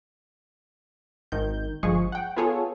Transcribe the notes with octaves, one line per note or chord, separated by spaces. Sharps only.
G#1 D#3 G6
G1 F3 G#3 G#4 C#6
F#5 G5
B3 F4 G#4 A4 C#5